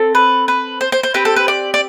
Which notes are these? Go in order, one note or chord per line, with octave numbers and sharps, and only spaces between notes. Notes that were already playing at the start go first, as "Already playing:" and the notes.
Already playing: C4 A4
B4
B4
C5
C5
C5
C4 G4 B4
A4
B4
D5
D5